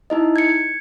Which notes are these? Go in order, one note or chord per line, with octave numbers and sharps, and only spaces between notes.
D#4 E4 D#5
G#6 C#7